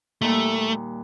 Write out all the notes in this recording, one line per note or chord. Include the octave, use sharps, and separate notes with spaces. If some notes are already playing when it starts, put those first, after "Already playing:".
D#2 A#2 G3 A3